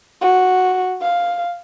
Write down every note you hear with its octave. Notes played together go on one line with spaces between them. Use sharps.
F#4
F5